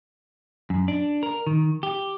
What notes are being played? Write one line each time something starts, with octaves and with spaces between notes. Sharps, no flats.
F#2
D4
A#4
D#3
G4